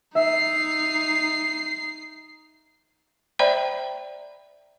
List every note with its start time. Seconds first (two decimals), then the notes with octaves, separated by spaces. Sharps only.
0.15 D#4 E5 C7
3.39 C5 D5 E5 G5 A#5 B5